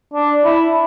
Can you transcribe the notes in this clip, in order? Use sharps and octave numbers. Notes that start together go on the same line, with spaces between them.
D4
E4